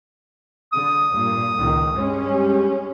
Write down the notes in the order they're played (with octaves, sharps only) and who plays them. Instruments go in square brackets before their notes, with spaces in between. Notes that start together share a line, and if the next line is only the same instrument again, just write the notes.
[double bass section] D3 [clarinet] D#6
[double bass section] G2 A#2
C#2 A#2 D#3
G2 G#3 C#4
[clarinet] G4